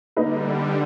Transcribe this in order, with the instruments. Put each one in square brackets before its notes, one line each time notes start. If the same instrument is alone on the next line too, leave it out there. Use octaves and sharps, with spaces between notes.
[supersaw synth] D3 G3 [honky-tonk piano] A#3 D#4 B4